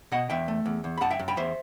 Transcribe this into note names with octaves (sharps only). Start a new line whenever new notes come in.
B2 D#5 F#5
E2 E5 G5
A3
E2
E2
B5
F#2 F#5 A5
E5 G5
F#2
G5 B5
E2 C5 E5